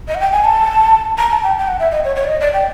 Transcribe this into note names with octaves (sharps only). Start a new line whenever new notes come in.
D#5
F#5
G5
G#5
A5
A#5
A5
G5
G5
F#5
E5
D#5
C#5
C#5
D5
D#5
D5
G5